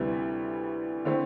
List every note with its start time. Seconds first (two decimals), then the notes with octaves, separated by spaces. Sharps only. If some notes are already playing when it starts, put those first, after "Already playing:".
Already playing: D2 C3 G3 B3 E4
1.05 D3 A3 C4 E4